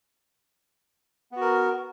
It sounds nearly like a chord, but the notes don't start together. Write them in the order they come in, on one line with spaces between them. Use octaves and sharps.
B3 F#4 A#4